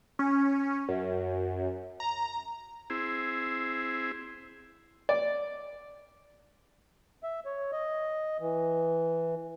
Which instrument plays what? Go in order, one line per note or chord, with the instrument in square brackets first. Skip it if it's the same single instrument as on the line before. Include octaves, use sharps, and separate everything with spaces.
[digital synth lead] C#4
F#2
A#5
[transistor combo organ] C4 E4 G#4
[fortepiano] D5
[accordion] E5
C#5
D#5
E3